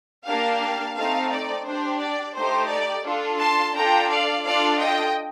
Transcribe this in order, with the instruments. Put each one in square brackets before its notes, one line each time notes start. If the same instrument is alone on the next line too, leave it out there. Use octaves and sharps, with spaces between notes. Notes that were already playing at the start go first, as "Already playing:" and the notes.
[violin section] A#3 D4 G4 F5 A5
A3 C4 D#4 F5 A5
D5
D4 G4 C5
D5
A3 D#4 G4 C5
D5
D4 F4 A4
A5 C6
D4 F4 A4 G5 A#5
D5 F5
D4 F4 A4 D5 F5
D#5 G5